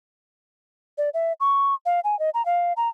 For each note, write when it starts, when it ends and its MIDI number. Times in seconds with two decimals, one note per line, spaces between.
0.98 1.10 74
1.14 1.33 76
1.40 1.74 85
1.86 2.00 77
2.04 2.18 80
2.19 2.30 75
2.34 2.45 82
2.46 2.73 77
2.77 2.89 82